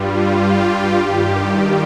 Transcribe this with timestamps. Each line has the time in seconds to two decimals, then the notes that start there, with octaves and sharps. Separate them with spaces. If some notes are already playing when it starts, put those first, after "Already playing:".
Already playing: G2 G3 F4
0.16 G4
0.56 G4
0.97 G2 D#3 G3